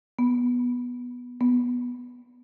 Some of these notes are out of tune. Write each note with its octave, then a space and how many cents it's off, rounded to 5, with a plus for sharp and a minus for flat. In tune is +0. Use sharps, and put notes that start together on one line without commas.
B3 -10
B3 -5